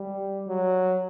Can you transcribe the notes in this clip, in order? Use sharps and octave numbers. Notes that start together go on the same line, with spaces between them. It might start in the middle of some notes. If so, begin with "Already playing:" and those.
Already playing: G3
F#3